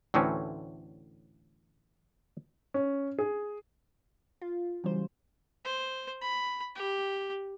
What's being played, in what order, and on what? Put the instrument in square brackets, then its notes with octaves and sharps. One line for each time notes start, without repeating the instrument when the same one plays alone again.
[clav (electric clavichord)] D2 A2 E3 C4 C#4
[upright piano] C#4
G#4
[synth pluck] F4
C#3 E3 F#3 G3 C5
[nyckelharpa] C5
B5
G4